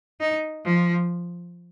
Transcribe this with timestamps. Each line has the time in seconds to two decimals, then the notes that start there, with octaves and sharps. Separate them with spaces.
0.20 D#4
0.65 F3